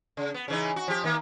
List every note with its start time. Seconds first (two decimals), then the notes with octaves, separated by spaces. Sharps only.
0.17 C#3
0.34 B3
0.48 C#3 E3 D#4
0.76 F#4
0.88 F3 G4
1.04 D#3 A#3